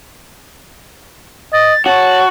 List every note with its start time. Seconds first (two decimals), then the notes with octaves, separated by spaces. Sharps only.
1.53 D#5 A6
1.86 F#4 C#5 A5